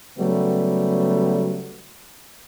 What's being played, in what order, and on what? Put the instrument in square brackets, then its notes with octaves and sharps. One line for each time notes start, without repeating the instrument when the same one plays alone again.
[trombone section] C#3 F#3 G3 A3 B3